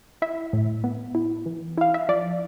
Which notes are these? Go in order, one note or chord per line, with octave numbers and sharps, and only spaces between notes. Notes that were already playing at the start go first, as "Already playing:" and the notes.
E4 E5
A2
B3
E4
E3
E4 F5
E5
F3 D5